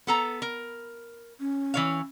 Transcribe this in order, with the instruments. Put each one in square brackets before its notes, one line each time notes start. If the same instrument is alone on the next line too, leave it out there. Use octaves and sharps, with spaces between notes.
[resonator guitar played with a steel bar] B3 A4 A#5
A#4
[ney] C#4
[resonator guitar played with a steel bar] E3 C#5 F5